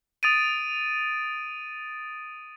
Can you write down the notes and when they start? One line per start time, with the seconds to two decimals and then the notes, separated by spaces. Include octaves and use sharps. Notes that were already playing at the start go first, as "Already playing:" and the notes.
0.23 D#6 A6 D7 D#7